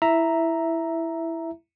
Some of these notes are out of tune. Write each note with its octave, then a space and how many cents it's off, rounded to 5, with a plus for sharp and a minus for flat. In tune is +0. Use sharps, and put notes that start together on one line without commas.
E4 +0 E5 +0 A#5 +0